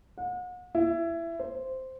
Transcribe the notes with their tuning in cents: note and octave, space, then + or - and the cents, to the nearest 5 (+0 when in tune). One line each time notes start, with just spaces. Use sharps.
F#5 -40
E4 +20
C5 -5